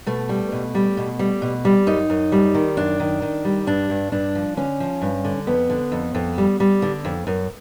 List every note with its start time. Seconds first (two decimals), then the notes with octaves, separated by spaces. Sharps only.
0.06 B2 A3
0.29 G3
0.52 B2
0.75 G3
0.97 B2
1.19 G3
1.42 B2
1.65 G3
1.87 F#2 D#4
2.10 F#2
2.32 G3
2.54 D#3
2.77 F#2 D4
3.00 D#3
3.22 D#3
3.45 G3
3.67 G2 D4
3.90 G2
4.12 G2 D4
4.35 F3
4.57 D3 C#4
4.80 F3
5.02 G2
5.25 D3
5.47 F2 B3
5.70 D3
5.92 F2
6.15 F2
6.38 G3
6.60 G3
6.82 D3
7.05 F2
7.27 F#2